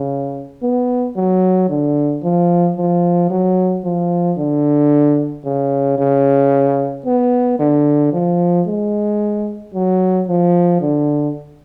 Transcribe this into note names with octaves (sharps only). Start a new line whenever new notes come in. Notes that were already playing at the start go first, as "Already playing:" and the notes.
Already playing: C#3
B3
F#3
D3
F3
F3
F#3
F3
D3
C#3
C#3
B3
D3
F3
G#3
F#3
F3
D3